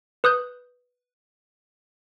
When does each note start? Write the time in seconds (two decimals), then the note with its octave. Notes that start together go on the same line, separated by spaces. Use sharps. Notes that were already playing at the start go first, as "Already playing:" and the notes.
0.24 B4 D#6 F#6 G6